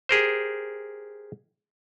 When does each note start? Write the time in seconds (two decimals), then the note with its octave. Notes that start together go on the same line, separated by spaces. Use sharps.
0.09 G4 G#4 A#4 C5